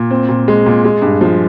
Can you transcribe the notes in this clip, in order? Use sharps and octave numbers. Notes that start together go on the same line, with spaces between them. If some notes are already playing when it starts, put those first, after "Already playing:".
Already playing: A#2
C4
A#2
G#3
A#2
G#3
G2
F3